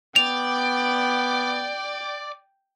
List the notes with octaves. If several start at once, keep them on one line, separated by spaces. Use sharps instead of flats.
B3 D5 G5 F7